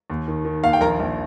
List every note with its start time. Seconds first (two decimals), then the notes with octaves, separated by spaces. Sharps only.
0.10 D#2
0.28 D#3
0.45 D#3
0.63 D#2 F5
0.73 G5
0.81 A#1 A#4 A#5
1.00 A#1